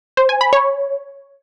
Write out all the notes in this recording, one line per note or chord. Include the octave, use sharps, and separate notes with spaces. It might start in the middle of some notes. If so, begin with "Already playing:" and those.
C5
G#5
B5
C#5